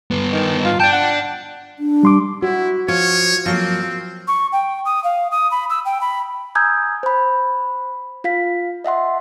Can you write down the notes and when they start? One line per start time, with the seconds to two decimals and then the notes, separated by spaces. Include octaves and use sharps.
0.11 G2 B3
0.33 D#3
0.64 F4
0.80 D5 G5 A5
0.92 F#5
1.79 D4
2.03 G3 C6 D6
2.42 E4 F#4
2.88 F3 C#5
3.46 F3 F#3 A#3 C4
4.28 C#6
4.53 G5
4.85 D#6
5.04 F5
5.32 D#6
5.51 B5
5.70 E6
5.85 G5
6.01 B5
6.55 G#5 A#5 D#6 E6 G6 G#6
7.03 C5 B5
8.24 F4 F5 B6
8.84 D#5 E5 F#5 C6